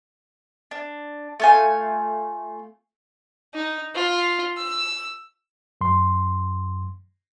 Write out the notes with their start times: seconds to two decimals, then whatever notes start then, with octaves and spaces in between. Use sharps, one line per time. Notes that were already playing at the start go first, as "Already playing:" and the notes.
0.71 D4
1.40 A3 F4 G#5
3.54 D#4
3.94 F4
4.57 E6
5.81 F#2 C6